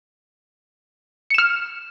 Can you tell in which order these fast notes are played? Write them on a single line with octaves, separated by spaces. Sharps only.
C#7 E7 F6